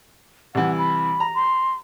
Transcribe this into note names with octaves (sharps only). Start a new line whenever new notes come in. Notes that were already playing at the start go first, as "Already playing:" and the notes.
C2 E3 F#5
B5
A#5
C6